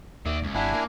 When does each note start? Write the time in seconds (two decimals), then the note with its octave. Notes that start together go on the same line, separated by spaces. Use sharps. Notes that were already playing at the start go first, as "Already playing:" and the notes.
0.26 D#2 D5 E5
0.42 C#2
0.55 G#1 D4 E4 G4 F#5 G#5
0.73 A#3